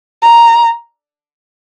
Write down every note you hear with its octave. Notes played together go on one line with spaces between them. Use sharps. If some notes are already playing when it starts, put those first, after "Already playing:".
A#5